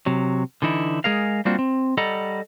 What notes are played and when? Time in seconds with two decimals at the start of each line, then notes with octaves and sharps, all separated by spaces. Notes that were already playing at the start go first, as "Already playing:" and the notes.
0.06 C3 F#3
0.62 D3 E3 D#4 E4
1.04 G#3 G#4 A#4 F5
1.45 G3 A#3 C4 D4 F4 F#4
1.59 C4
1.98 G3 A4 D#5 F#5 A#5 B5